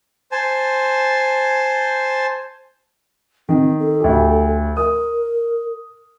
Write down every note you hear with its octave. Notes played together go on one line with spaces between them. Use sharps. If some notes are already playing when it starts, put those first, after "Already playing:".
C5 G#5 A5
D#3 C4
A4
D2 G4
A#4 D#6